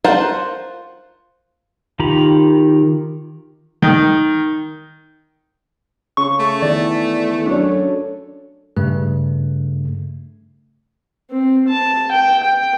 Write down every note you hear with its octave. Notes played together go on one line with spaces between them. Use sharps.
F4 A#4 C5 F#5 A5
D#3 F4 G4 A#5 B5
D#3
C#3 C#6
A3
E2 D#3 D5
F#2 D4 A4 C#5
G2 C#3 A3
C4
A5
G5
G5